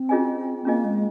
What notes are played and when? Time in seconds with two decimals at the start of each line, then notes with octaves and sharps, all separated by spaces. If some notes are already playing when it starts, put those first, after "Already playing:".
Already playing: C4
0.09 C#4 F4 G#4 D#5 G#5
0.65 A#3 C#4 F4 G#4 D#5 G#5
0.84 G#3